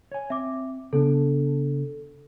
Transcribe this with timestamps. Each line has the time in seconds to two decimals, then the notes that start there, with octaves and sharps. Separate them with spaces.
0.12 C#5 G#5
0.30 C4 E5 D6
0.93 C#3 B3 D4 A4